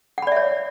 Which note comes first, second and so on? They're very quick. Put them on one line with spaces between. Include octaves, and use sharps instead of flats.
F#5 B5 D5 E5 C#5